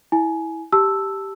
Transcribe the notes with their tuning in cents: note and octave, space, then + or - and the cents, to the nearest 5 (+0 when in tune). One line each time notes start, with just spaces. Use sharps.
E4 -15 G#5 +20
G4 -5 A5 +0 E6 +0